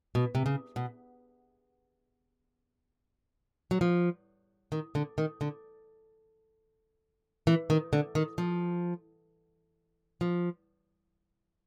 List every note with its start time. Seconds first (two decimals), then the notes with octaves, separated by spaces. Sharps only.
0.15 B2
0.35 C3
0.46 C#3
0.76 B2
3.71 F#3
3.81 F3
4.72 D#3
4.95 D3
5.18 D#3
5.41 D3
7.47 E3
7.70 D#3
7.93 D3
8.15 D#3
8.38 F3
10.21 F3